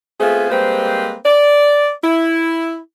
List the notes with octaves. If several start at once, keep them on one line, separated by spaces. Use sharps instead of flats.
A3 B3 C4 F4 G#4
G3 G#3 A#3 C4 B4 C5
D5
E4